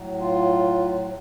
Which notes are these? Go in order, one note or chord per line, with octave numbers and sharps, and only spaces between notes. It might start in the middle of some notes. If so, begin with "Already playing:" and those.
Already playing: A2 F#3
F4